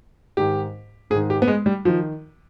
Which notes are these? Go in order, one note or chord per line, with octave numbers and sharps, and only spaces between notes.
G#2 D#3 G4
G#2 G#4
D#3
G4
B3
G#3
G3
D#3 F3